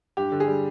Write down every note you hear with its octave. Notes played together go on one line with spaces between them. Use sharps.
G2 G4
D3
G#4
G3